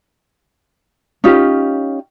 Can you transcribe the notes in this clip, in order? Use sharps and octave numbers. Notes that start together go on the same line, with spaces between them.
C#4 D#4 F4 G4